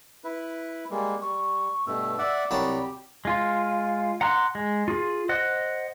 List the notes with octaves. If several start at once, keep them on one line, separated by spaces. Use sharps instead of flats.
E4 B4
G3 G#3 A#3
G3 C#6
G2 B2 A3 E6
D5 E5 F#5
C2 F#3 G4 A5 B5
G#3 F4
F#5 A#5 C6 F#6
G#3
F4 G#4
C5 D#5 F#5 F#6